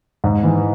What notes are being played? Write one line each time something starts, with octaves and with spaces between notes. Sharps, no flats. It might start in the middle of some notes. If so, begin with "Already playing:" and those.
G#2
E3